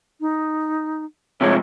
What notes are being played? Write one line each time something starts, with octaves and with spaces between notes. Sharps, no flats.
D#4
C3 F3 G#3 C#5